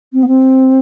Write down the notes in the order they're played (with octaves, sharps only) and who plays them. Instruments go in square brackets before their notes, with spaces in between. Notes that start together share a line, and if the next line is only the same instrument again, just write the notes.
[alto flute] C4
B3
C4